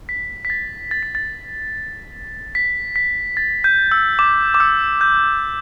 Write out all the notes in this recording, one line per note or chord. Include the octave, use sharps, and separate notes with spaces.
B6
B6
A6
A6
B6
A6
B6
B6
A6
G6
E6
D6
D6
E6
G6